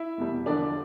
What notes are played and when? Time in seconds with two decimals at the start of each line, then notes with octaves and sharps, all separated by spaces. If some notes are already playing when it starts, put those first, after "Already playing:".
Already playing: E4 E5
0.18 F1 E2 B2 G3
0.46 E2 D3 F3 D4 D5